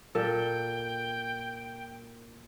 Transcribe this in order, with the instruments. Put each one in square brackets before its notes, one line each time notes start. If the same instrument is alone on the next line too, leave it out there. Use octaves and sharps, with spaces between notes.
[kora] A#2 A4 [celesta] A#4 [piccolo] G5